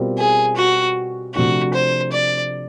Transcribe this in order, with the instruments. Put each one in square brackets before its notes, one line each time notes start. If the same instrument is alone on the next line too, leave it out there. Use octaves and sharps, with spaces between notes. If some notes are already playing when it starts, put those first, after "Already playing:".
Already playing: [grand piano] B2 G3 C4 F4 A#4
[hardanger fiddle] G#4
F#4
[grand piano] C3 F3 A3 D4 [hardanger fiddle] F#4
[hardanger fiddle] C5
D5